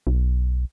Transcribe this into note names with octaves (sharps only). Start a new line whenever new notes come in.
B1